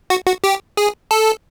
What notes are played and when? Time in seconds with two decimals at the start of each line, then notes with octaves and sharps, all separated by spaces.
0.10 F#4
0.27 F#4
0.44 G4
0.77 G#4
1.11 A4